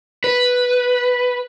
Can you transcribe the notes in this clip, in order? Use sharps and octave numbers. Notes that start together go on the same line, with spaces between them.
B4